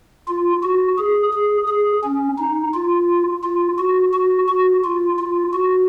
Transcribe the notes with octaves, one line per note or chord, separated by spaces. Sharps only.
F4
F#4
G#4
G#4
G#4
C#4
D#4
F4
F4
F#4
F#4
F#4
F4
F4
F#4